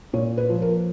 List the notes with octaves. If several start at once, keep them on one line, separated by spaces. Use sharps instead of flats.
A#2 C#5
B4
F3
A#4